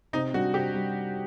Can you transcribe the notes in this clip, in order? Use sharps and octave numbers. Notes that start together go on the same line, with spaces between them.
C3 D#4
G3 D4 F#4
C3 G4
G3